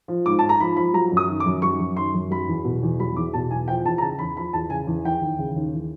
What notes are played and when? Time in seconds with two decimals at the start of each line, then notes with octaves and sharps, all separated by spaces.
0.08 F3
0.26 G#2 D6
0.39 G#2 A5
0.49 A#5
0.60 F3 B5
0.77 F3 B5
0.94 F#3 A#5
1.12 F#2 D#6
1.29 D#3
1.40 D6
1.46 F#2
1.62 F#3 C#6
1.80 F#2
1.97 D#3 C6
2.14 F#2
2.31 F#3 B5
2.48 E2
2.65 B2
2.83 E2
3.00 F#3 B5
3.16 E2 D6
3.34 B2 A5
3.51 E2 G#5
3.68 F3 G5
3.86 E2 A5
3.98 A#5
4.02 C#3 A5
4.19 E2 B5
4.36 F3 B5
4.53 E2 A5
4.70 C#3 G#5
4.87 E2
5.05 E3 G5
5.21 D#2
5.39 C#3
5.56 D#2
5.74 E3